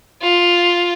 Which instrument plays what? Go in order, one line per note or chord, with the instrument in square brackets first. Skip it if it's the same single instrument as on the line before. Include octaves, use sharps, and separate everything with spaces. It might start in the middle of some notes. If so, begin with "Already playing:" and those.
[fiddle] F4